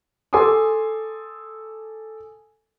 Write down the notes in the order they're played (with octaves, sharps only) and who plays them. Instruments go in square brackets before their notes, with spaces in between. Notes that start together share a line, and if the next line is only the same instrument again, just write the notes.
[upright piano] A4 G#5 C6 D6 D#6